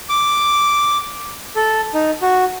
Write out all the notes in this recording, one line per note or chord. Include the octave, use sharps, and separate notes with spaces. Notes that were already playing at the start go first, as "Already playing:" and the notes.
D6
A4
D#4
F#4